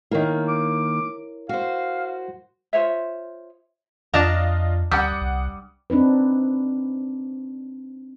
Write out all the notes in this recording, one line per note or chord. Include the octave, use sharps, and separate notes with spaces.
D#3 A#3 E4 A#4 C#5
D6
F#4 C5 F5
F4 C5 C#5 E5
F2 D4 F4 D5 D#5 A5 A#5
D2 G3 F#5 D6 D#6
C2
C4 D4 D#4 B4